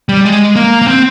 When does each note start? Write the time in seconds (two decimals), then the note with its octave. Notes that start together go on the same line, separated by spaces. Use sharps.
0.09 G3
0.25 G#3
0.56 A#3
0.82 A#3
0.87 C4